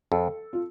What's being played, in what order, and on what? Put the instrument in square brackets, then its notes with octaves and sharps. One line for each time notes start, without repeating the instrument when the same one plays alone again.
[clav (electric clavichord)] F2 [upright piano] A4
[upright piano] F4